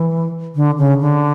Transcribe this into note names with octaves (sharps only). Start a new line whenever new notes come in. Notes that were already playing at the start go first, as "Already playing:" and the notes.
Already playing: E3
D3
C#3
D3